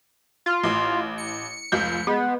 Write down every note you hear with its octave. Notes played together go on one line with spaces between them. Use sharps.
F4
A1
C#7
F1 C#2 G6
G#3 B3